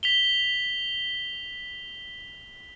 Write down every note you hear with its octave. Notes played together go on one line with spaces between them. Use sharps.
B6 F7 G7